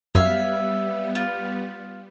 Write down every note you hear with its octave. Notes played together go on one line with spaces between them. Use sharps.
F#2 G3 B3 C#5 E5 F5
F4